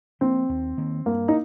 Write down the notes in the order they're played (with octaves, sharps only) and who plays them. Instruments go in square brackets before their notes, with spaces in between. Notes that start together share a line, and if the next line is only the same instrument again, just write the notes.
[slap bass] F3 A#3 [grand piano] C4
[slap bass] D#2
D#3 A#3
[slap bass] G2 [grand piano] A#3
[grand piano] D#4